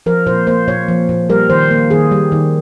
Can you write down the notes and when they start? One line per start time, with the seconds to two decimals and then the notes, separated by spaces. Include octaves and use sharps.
0.06 F3 A#4
0.26 A#2 C5
0.47 A#3 C5
0.68 A#2 C#5
0.88 F3
1.09 A#2
1.29 G3 A#4
1.50 D#3 C5
1.71 A#3
1.90 D#3 G#4
2.11 G3
2.32 D#3